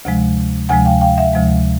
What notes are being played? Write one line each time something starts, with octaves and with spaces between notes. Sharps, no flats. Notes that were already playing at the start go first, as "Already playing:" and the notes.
D2 C3 F3 G#3
D2 C3 F3 G#3 F#5 G#5
F5 G5
F5 G5
E5 F#5
D2 C3 F3 G#3